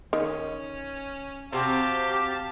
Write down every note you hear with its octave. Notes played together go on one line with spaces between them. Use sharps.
D#3 C#4
C3 C4 F#4 G4 F5 A5